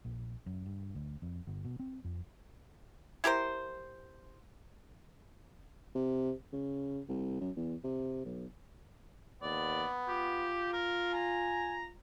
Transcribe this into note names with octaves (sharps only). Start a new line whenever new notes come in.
A#1
F#2
G2
D2
F2
G1
B2
C4
F2
E4 G4 A#4 C5
C3
C#3
C2
F#2
E2
C3
B1
D#2 B3 D5
F4 G4
A#4
G#5 A#5